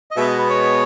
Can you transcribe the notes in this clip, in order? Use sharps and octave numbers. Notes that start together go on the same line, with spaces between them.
D#5
B2 G#3 B3 E5
D#5
B4
C#5